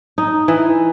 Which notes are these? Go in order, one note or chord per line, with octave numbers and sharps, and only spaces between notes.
D#4
E3